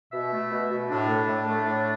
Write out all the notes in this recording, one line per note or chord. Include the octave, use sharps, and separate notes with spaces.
B2 E5
A3
B2
B2
A2 D4
A3
A2
A3
A2